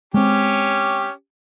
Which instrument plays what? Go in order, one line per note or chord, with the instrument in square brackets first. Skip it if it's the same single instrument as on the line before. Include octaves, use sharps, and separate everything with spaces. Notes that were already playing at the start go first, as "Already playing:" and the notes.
[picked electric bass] G#3 C4 [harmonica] C#4 G4